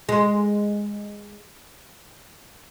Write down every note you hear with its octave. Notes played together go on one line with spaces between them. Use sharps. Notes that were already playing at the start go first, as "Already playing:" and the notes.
G#3